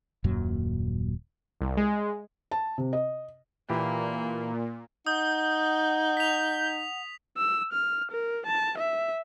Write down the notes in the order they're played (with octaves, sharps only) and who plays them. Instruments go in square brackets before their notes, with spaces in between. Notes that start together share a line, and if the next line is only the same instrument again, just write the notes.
[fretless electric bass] D#1 F#2 A#2 F#3
[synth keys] C2
G#3
[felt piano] A5
C3
D#5
[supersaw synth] A#2 [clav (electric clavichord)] E3 G4 [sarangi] A#3
[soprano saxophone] D#4 [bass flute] F#5 [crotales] D#6 [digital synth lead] G6
[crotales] B6 F7
[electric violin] E6
F6
A#4
A5
E5